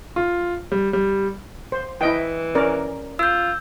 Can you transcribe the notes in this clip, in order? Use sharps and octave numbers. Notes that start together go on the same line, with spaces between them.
F4
G3
G3
C5
E3 E4 D#5 G5
C#4 A#4 D5
F4 E6 G6